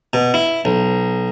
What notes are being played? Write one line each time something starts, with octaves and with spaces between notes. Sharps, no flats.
B2
E4
B1